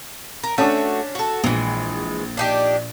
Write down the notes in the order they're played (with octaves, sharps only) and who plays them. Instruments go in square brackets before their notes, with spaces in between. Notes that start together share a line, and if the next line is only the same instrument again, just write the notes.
[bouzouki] A#4
[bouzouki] A3 F#4 E5 [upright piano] C#4 D4
[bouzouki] F#4 A4
[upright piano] A#1 [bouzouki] E3 G#3
[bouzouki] D4 D#4 G4